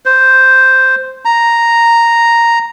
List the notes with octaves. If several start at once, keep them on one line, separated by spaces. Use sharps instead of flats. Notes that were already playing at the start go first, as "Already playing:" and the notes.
C5
A#5